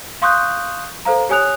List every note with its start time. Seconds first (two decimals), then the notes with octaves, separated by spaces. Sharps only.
0.22 F5 C6 C#6 D#6 F#6 G6
1.05 A4 C5 F5 A#5
1.29 G4 C#5 G#5 D#6 F#6 F7